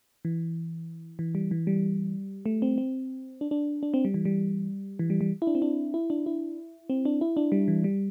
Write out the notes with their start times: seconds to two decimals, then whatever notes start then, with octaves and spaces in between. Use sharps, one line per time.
0.25 E3
1.19 E3
1.35 G3
1.51 E3
1.67 G3
2.46 A3
2.62 C4
2.78 C4
3.41 D4
3.51 D4
3.83 D4
3.94 C4
4.05 G3
4.14 E3
4.25 G3
4.99 E3
5.10 G3
5.21 G3
5.42 E4
5.47 D4
5.55 C4
5.62 D4
5.94 E4
6.10 D4
6.26 E4
6.90 C4
7.05 D4
7.21 E4
7.37 D4
7.52 G3
7.68 E3
7.84 G3